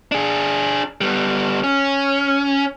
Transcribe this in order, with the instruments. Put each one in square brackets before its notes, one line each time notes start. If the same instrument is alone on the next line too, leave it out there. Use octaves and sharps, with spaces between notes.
[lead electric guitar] D4 G#4
G3 B3
C#4